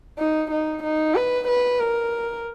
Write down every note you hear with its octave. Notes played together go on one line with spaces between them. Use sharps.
D#4
D#4
D#4
B4
B4
A#4